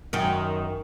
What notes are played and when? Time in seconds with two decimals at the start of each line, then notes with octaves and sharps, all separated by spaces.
0.13 F#2 D#3